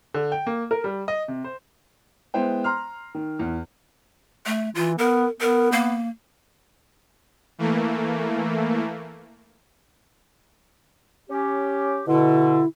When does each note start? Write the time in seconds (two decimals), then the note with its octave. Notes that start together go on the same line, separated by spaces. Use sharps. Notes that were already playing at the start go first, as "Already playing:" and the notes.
0.14 D3
0.32 G5
0.47 A#3
0.71 A#4
0.84 G3
1.08 D#5
1.28 C3
1.44 C5
2.34 G#3 B3 E4 C5 G5
2.64 A#5 C6 F6
3.15 D#3
3.39 E2
4.46 A3
4.75 E3 F4
4.98 B3 A#4
5.41 B3 A#4
5.72 A#3
7.58 E3 A3 A#3
11.30 C#4 G4
12.07 B2 D3 E4